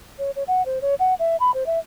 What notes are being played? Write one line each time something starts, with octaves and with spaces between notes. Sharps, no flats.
C#5
C#5
F#5
C5
C#5
F#5
E5
B5
C5
E5